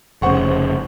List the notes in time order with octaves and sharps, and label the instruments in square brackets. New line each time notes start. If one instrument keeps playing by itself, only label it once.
[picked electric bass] F1 C#3 [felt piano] C5 F#5 C#6